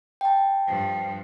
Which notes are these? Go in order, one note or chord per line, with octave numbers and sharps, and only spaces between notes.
G5 A5
G2 F3